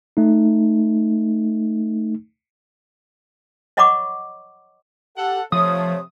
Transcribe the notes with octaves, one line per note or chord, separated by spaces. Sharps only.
A3 D#4
C#5 D#5 F#5 B5 C#6 D6
G4 A4 F#5
C3 F3 A3 C#5 D#6